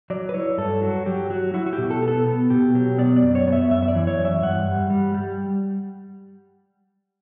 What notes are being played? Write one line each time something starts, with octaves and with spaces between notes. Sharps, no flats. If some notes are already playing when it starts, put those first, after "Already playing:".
F#3 D5
B4
E4 C#5
G2 A4
F#3 F#4
F#3 G4
F#3 F#4
E4 F#4
F#4
G4
B2
A4
B3
A4
B3
B2 G4
F#3 G4
B3 D5
D5
F#2
C#5
B3
E5
F#2 E5
E5
D5
E3
C#5
F#2
E5
G2 F#5
G3
G3
G3